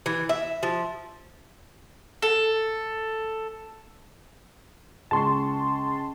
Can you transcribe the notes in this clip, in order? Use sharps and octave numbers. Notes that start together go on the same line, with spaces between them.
E3
E5
F3
A4
C#2 C#4 A5 C6 C#6